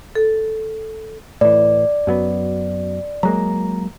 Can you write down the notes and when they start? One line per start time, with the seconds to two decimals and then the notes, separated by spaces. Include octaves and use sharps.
0.15 A4
1.41 A2 E3 D5
2.07 F#2 F#3 B3
3.23 F#3 G#3 A#3 A#5